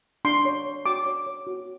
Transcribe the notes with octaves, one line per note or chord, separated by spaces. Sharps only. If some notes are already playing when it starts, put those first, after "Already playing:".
D4 C6
C#5
C#5
F#4 D6
C#5
C#5
F#4